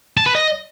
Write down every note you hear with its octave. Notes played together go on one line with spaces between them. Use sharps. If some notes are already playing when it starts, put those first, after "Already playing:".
A5
B4
D#5